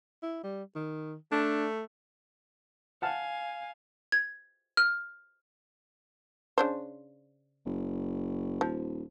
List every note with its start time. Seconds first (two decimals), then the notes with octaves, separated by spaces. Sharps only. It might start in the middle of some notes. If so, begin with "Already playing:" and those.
0.23 E4
0.44 G3
0.75 D#3
1.32 A3 D4
3.02 F5 F#5 G#5 A5 F6
4.12 G#6
4.77 F6
6.58 C#3 D4 C5
7.66 F#1
8.61 D#1 F3